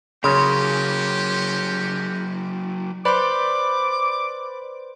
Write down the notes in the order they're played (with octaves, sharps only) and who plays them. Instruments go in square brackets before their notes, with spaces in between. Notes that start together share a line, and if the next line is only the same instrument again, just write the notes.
[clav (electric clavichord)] C#3 [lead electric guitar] F#3 A#3 [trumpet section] C#4 F#4 G4 [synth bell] C6
[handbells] B4 C5 C6 [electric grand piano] D5 B5 [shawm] D6